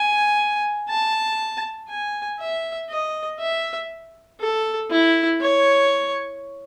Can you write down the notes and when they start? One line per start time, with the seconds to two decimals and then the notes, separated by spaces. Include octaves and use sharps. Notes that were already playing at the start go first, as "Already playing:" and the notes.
Already playing: G#5
0.89 A5
1.89 G#5
2.39 E5
2.90 D#5
3.39 E5
4.40 A4
4.90 E4
5.40 C#5